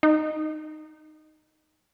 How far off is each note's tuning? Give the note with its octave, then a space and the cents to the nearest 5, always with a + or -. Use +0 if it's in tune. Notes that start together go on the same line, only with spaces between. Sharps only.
D#4 +0